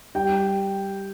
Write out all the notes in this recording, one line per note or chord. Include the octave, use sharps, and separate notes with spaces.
G3 G5